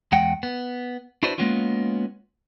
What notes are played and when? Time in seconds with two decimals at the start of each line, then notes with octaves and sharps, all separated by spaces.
0.12 E2 G#3 F#5 G5
0.43 B3
1.23 D4 E4 F#4 B4 C5 D5
1.38 G#3 A#3 B3 C#4 F4